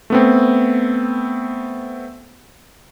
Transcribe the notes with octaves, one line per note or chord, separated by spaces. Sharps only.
A3 B3 C4